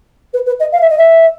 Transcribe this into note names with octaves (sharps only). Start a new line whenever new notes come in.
B4
B4
D#5
F5
E5
D#5
E5